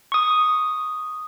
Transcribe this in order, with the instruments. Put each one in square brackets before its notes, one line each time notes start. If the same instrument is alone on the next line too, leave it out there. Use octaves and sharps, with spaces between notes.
[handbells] C#6 D#6